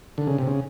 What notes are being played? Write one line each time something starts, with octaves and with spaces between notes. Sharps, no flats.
D3
C#3
C3
C#3